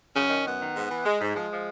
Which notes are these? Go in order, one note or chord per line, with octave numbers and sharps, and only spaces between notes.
F#2 C#4
D#3
F#2 B3
D#3
G#2
E3
G#3
G#2
F3 G#3
F3